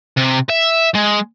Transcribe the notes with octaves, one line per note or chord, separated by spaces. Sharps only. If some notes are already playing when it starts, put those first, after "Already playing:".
C3
E5
G#3